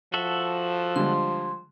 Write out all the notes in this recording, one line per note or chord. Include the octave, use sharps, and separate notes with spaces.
F3 F#4 A4 E5
D3 G3 G#3 C6